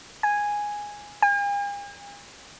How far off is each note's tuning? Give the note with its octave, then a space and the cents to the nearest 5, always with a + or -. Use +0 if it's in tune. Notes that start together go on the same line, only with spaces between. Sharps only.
G#5 -5
G#5 -45